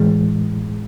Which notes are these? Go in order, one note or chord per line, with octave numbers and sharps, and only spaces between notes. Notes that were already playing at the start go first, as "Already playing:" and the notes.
Already playing: A2 E3 G#3